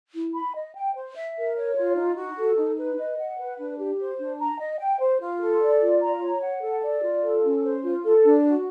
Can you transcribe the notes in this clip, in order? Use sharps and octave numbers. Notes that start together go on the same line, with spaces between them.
E4
B5
D#5
G5
C5
E5
A#4
C#5
F4
D#4
F#4
A4
D#4
B4
D#5
F#5
B4
D4
G4
C5
D4
A#5
D#5
G5
C5
F4
A4
D5
F4
A#5
C#5
F#5
A4
D5
F4
A4
C#4
C5
F4
A4
D4
F#4